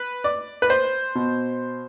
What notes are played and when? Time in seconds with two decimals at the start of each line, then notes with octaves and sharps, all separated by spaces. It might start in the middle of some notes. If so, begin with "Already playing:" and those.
Already playing: B4
0.24 D5
0.62 B4
0.70 C5
1.15 B2